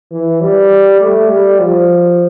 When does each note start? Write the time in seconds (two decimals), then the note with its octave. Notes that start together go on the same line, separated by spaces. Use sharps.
0.12 E3
0.41 G3
1.01 A3
1.30 G3
1.60 F3